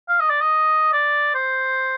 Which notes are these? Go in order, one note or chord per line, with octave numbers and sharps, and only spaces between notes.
F5
D#5
D5
D#5
D5
C5